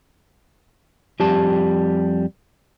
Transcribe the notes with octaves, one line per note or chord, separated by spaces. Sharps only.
F2 G3 G4 A5